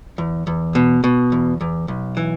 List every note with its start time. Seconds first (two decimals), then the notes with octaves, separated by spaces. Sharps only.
0.18 E2
0.47 E2
0.75 B2
1.04 B2
1.32 E2
1.61 E2
1.88 B1
2.17 E3